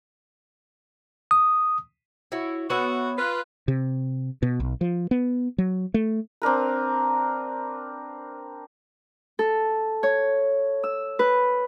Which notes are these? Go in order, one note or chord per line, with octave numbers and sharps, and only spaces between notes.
D#6
E4 F#4 C#5
B3 F#4 C#5 E5
F4 B4
C3
B2
B1
F3
B3
F#3
A3
C4 D4 A#4 B4
A4
C#5
E6
B4